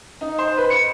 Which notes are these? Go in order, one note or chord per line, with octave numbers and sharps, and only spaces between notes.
D#4
C5
B4
C#7